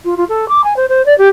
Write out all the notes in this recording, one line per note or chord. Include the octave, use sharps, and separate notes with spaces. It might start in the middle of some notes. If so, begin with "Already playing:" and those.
F4
F4
A4
D6
G#5
C5
C5
D5
G4